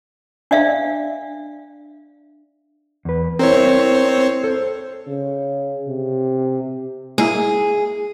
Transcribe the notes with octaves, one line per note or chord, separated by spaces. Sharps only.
D4 D5 E5 F5
E2 B4
C4 E4 A#4 C5 C#5
A4 C5
C#3
C3
G#3 A#3 E4 G#4